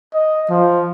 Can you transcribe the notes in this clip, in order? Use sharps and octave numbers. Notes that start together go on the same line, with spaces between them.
D#5
F3